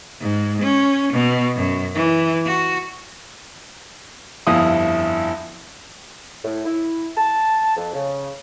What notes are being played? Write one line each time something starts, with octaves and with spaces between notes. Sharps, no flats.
G#2
C#4
B2
F#2
E3
F#4
G1 F2 E4 F5 D#6
A2
E4
A5
F2
C#3